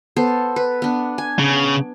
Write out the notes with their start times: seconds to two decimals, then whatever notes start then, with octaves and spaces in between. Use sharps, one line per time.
0.16 B3 A4 C5
0.56 B4
0.82 B3 D4
1.18 G#5
1.39 C#3